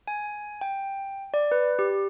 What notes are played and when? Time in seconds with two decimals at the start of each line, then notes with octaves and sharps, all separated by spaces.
0.08 G#5
0.61 G5
1.34 D5
1.52 B4
1.79 G4